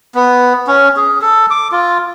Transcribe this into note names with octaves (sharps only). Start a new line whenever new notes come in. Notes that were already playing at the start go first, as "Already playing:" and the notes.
B3
C#4
G#4
A4
D6
F4